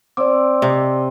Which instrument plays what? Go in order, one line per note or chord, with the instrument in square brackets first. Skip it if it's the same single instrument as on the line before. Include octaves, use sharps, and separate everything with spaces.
[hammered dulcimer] C4 [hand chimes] D5 D6
[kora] C3 [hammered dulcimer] D#5